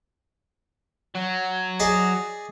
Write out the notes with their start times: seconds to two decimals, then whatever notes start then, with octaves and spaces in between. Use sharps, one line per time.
1.15 F#3
1.80 G#4 D5 D#5